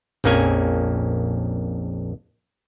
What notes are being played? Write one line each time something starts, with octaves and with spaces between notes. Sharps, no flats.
A#1 F2 A#3 C#4 G#5